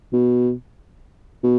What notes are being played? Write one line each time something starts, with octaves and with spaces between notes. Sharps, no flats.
B2
B2